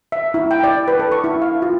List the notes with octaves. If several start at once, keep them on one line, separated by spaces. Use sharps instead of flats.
E5
E4
G5
D5
B4
A4
C#6
E4
F5
F4